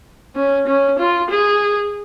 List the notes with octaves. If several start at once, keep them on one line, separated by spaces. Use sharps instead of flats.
C#4
C#4
F4
G#4